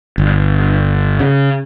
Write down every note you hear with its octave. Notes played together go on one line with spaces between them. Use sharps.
G1
C#3